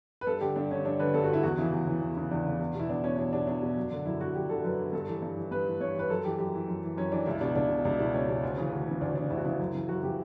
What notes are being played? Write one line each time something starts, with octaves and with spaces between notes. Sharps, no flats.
B4
G2 A4
D3 G4
G2 D4
D3 C#4
G2 D4
D3 B4
G2 A4
F#4
D3 E4
E2 F#4
C#3 E3 E4
E2
C#3 E3
E2
C#3 E3
E2 D4
C#3 E3
E2
B2 E4
E2 D4
B2 C#4
E2 D4
B2 D4
E2 D4
B2
F#2
D3
F#2 E4
D3 F#4
F#2 G4
D3 A4
F#2 B4
D3
G2 A4
E3 A4
G2
E3
G2 B4
E3
G2 C#5
E3 B4
F#2 A4
E3 G4
F#2 G4
E3
F#2
E3
F#2 C#4
E3 D4
C#2 E4
B2 D4
C#2 D4
B2
C#2 D4
B2 E4
C#2 C#4
B2
D2
C#3 E3
D2
C#3 E3
D2 D4
C#3 E3 D4
D2 E4
F#4
C#3 E3 E4
F#2
C#3 E3
F#2 F#4
C#3 E3 G4